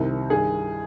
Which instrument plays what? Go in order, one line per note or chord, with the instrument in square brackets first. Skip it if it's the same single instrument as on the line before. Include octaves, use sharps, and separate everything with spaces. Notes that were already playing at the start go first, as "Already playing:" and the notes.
Already playing: [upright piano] C2 C3 D#3
G2 D#3 G#4